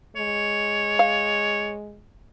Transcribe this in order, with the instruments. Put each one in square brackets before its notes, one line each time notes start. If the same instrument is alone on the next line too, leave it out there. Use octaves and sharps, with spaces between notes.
[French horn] G#3 [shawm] C#5
[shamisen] F5